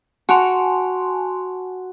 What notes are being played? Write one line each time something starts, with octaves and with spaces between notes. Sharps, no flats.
F#4 G#5 A5 C6